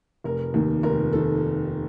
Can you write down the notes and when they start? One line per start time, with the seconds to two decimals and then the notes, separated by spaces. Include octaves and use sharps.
0.24 F1 A#4
0.54 D#2 D#3
0.83 F1 A#4
1.13 D#3 A4